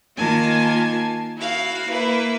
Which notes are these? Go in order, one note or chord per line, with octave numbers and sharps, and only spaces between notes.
D#3 A#3 F4 G#5 A5
E4 F#4 F5
A#3 E4 B4